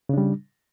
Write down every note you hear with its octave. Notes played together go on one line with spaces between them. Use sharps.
C#3 G3 D4